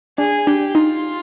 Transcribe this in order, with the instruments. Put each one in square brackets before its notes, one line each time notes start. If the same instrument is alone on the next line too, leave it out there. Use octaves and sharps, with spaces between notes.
[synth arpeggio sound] D4 [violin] G#4
[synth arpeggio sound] D4 [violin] G4
[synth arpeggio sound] D#4 [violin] F4